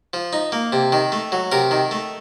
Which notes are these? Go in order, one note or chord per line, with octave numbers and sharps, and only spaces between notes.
F3
D#4
A#3
C3
D#3
A3
F#3
C3 A#4
D#3
A3